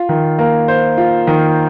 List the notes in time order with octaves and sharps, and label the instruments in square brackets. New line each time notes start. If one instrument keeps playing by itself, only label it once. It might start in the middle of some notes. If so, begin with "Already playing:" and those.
Already playing: [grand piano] F4
D#3
A#3
C5
F4
D#3